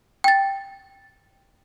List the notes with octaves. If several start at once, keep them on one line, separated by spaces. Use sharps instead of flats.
G5 A6